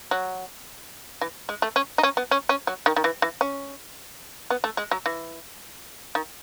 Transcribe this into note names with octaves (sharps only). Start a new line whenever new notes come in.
F#3
E3
G#3
A3
C#4
D#4
C#4
B3
C#4
C#4
F#3
D#3
D#3
E3
E3
C#4
B3
A3
G#3
F#3
E3
D#3